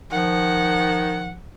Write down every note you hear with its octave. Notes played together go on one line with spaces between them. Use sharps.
D#3 F3 F#5